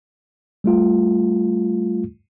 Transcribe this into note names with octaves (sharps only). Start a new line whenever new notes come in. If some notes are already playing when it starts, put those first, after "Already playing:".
G3 A3 F4